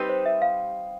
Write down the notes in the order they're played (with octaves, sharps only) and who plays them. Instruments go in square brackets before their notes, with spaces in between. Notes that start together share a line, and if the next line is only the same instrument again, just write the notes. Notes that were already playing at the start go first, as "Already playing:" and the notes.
Already playing: [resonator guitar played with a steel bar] G3 C4 D#4 G4 B4
[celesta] C5
E5
F5